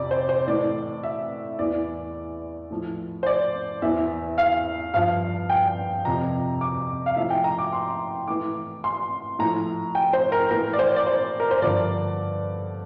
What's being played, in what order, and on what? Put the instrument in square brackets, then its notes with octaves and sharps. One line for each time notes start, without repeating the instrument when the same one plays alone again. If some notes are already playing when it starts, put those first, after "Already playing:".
Already playing: [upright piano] F2 C3 D5
C5
C5
A2 E3 D5
E5
E2 E3 D5
A2 F3
C5
D5
E2 E3 E5
F5
G2 F3 F5
G5
F2 C3 F3 A#5
D6
F5
A2 F3 E5
G5
A#5
D6
C6
A2 E3 D6
C6
A2 F3 A#5
G5
C5
A#4
A2 E3 A#4
D5
C5
D5
C5
A#4
C5
G2 D3 F3 D5